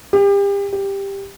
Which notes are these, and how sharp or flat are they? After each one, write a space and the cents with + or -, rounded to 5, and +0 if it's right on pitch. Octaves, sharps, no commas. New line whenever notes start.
G4 +35
G4 +10